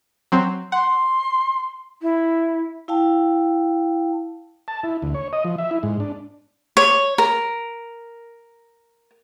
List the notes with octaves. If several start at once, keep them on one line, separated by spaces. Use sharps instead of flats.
F#3 C4
F#5 C6
E4
E4 F5 G5 A5
A5
E4
D2
C#5
D#5
F3
E5
E4
G#2
D4
C#5
A#4